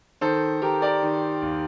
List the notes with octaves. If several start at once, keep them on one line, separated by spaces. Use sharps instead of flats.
D#3 A4 C5
D#3 G4 A#4
A#4 D5
D#3
D#2